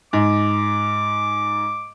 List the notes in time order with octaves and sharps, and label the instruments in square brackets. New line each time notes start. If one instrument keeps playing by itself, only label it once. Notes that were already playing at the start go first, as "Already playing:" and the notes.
[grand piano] G#2 [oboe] D6